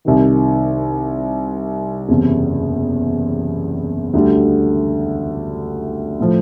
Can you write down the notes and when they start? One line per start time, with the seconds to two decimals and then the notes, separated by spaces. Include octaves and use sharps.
0.05 C2 C3 D#3
2.09 F#1 E2 C3
4.13 D2 D3 G3
6.20 A2 F3